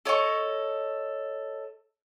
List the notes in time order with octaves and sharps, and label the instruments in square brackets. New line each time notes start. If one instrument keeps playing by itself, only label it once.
[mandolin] A4 C#5 D#5 C#6